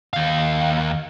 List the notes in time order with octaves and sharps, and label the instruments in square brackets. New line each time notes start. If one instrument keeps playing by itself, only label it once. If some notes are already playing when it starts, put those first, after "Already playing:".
[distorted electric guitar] D#2 F5